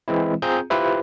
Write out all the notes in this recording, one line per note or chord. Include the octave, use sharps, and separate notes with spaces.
E3 G#3 C4 E4
C4 F4 G#4 A#5 G6
E4 F4 G4 B4 C5 E5